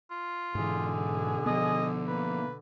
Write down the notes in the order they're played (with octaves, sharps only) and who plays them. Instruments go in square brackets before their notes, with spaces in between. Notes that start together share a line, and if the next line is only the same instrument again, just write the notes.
[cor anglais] F4
[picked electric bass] G#2 E3 [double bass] B2 D3 [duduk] G#4
[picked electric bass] F3 B3 [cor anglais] D#5
[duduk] A#3 [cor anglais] B4